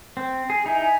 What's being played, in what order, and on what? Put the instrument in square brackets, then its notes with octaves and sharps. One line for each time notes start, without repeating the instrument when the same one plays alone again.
[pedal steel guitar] C4
G#4
[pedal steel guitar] D#4 E4 [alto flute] G#5
[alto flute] G#5